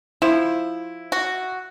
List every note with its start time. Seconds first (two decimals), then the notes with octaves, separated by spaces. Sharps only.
0.22 F3 E4
1.12 F#4